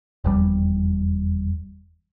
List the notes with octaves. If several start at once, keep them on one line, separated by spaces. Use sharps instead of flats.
F1 E2 G3